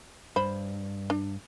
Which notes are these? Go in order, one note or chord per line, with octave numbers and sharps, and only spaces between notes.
G2 C5 B5
D4